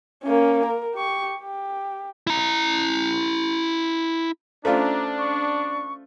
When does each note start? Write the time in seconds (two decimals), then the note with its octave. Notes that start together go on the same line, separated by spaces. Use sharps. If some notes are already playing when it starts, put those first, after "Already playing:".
0.24 A#3 C#4
0.65 A#4
0.95 G4 C#6
1.39 G4
2.27 E4 A#5
4.65 A3 C#4 D4 F4 C5 D5 A#5
5.18 C#6